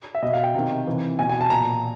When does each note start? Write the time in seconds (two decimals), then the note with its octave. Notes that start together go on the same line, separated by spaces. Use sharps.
0.15 E5
0.22 B2 D#5
0.33 F5
0.43 G5
0.54 C3 D#3
0.87 C3 E3
1.19 B2 G#5
1.29 G#5
1.41 A5
1.50 A#2 A#5